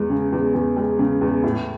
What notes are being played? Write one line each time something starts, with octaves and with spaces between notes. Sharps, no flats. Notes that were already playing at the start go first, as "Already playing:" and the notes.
Already playing: E2 G#3
C#3
E2
E2
G#3
C#3
E2
A2